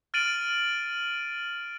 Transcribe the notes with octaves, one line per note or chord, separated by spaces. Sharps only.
F6 A6 D7 D#7 F#7